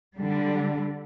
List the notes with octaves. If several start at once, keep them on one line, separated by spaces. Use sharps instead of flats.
D3 G3